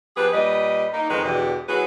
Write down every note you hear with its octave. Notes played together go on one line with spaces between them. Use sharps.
F3 G4 G#4 B4
A#2 G3 B4 D#5
A#3 D#4
F2 D#3 G#3 B4
E2 B2 D3 E3 G4
F#3 E4 F#4 G#4 B4